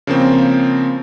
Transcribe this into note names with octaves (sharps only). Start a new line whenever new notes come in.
C#3 F3 A#3 C4